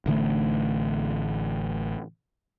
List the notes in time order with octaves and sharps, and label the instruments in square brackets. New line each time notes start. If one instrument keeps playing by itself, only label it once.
[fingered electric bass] A1 D3 E3 A3